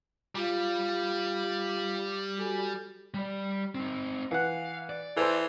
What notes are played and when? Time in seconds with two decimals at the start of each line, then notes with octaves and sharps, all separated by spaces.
0.35 G3 F4 F5
2.38 F#4 A4 G#5
3.14 G3 D5
3.75 C4 D#4
4.31 E3 F5 F#5
4.90 D5
5.17 E3 A4 C5